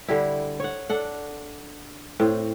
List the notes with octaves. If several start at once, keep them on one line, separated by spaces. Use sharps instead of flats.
D3 G3 E4
C#5 F#5
D4 A4 F#5
A2 C4